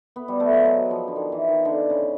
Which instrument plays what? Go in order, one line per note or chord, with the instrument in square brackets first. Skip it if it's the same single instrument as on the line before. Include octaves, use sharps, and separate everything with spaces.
[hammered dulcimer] B3
G3
A3
G#3
F#3
F3
D3
D#3
E3
D#3
D3
C#3